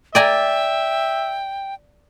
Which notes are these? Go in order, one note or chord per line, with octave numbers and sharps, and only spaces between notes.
D5 E5 G5 G#5 A#5